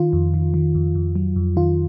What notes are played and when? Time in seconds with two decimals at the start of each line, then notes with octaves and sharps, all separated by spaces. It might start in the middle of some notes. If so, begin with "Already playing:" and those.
Already playing: D#3 F4
0.13 F2
0.34 D#3
0.54 D#3
0.75 F2
0.95 F2
1.16 F#3
1.36 F2
1.56 D#3 F4